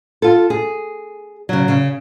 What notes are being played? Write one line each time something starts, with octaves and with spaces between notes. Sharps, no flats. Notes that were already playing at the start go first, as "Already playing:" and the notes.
F4 A4
G#4
C#3 F#3
C#3